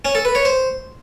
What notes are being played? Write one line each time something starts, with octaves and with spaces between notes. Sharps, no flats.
C#4
A4
B4
C#5
C5